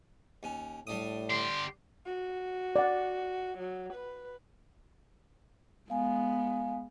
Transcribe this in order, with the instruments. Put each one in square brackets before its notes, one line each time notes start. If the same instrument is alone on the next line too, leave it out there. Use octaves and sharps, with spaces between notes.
[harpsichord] D#2 C#4
[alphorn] A2 [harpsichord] G3 D4 D#6
[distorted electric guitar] D3 G4 [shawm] C6
[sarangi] F#4
[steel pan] D5 F#5
[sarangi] F#3
B4
[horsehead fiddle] G#3 B3 [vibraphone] F5 G#5